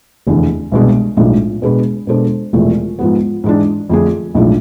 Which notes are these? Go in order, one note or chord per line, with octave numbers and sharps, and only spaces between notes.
F1 E2 D3
C2 B2 G#3 D4
B1 A2 F3 G#3 D4
B2 G#3 D4 G#4 B4
B2 G#3 D4 A4 C5
E1 E2 C3 F3 A3
G#2 F3 B3
G#2 E3 G#3 D4
F2 D3 A3 D4 G#4
B1 A2 F3 G#3 D4